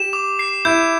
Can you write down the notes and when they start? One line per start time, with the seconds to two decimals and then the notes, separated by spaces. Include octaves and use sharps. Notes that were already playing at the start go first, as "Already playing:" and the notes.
Already playing: G4 E7
0.13 D6
0.39 C7
0.65 E4 G6